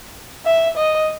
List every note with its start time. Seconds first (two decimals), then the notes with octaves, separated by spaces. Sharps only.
0.46 E5
0.77 D#5